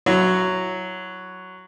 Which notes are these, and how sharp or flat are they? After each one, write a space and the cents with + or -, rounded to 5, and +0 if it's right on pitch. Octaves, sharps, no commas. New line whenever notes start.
F#3 +0 E4 +20 C#5 +0